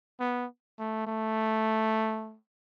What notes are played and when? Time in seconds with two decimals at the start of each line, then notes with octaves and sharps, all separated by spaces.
0.20 B3
0.79 A3
1.07 A3